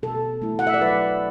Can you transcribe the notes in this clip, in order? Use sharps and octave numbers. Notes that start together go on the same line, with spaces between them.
B2 A4
A3 E4
F#5
E5
D5
F#3 B4